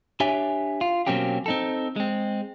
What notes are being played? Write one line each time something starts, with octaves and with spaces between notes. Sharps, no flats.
D4 G4 C#5 E5 G#5
F4
B2 F#3 A#3 C4 C#4 G4
C4 D#4 A4
G#3 C4